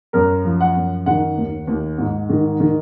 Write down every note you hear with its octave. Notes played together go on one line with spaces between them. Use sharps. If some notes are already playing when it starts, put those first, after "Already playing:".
F#2 A#4
F3
F#5
F#2
D#3 F#5
D#2
D#2
G#2
D#3
D#3